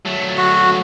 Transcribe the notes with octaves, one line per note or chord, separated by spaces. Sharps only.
F#3 A3
F#4